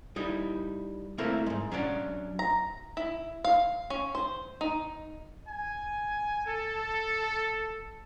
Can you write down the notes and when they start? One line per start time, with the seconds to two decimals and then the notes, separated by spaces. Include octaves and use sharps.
0.16 G3 D#4 E4
1.18 A3 A#3 C4 E4 A4 A#4
1.46 G#2 G#3
1.71 F#3 C#4 D4 D5
2.39 A#5
2.97 E4
3.44 F5
3.90 C#4
4.15 C5
4.61 D#4
5.48 G#5
6.46 A4